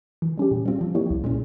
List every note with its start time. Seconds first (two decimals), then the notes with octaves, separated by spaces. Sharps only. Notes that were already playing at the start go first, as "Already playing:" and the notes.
0.22 E3
0.38 G3 C#4 G4
0.51 A#2
0.65 G3 C4 F4
0.81 F3
0.95 A#3 E4 G4 C#5
1.10 C2
1.24 A#2 G#3 C#4